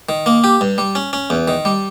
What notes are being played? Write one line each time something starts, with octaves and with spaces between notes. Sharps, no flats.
D#3
A#3
G4
G2
G3
C#4
C#4
E2
D#3
G3